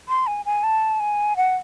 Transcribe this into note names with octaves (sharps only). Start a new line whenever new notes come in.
C6
G#5
G#5
A5
G#5
F#5